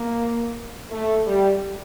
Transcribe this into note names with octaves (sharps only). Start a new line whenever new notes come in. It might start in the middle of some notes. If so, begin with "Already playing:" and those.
Already playing: A#3
A3
G3